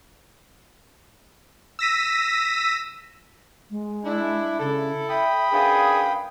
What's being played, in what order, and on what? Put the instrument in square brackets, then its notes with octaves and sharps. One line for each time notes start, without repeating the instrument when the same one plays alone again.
[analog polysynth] E6 A#6 B6 D#7
[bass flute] G#3
[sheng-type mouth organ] D4 [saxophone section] E4
[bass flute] C#3 [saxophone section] E4 A4
[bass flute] E5 [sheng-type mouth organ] G5 B5 D#6
[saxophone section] F#2 B3 D4 [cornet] G#4 [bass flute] F5